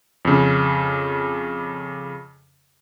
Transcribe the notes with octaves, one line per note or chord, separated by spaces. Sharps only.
F2 C#3